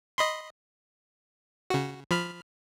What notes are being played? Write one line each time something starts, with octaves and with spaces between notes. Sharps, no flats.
D#5 B5 C6
C#3 F#4
F3 B5 F6